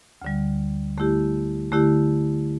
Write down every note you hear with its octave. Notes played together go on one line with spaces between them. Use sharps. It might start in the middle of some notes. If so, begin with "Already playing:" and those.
D2 D3 G3
D3 A3 E4 G4
D3 A3 E4 G4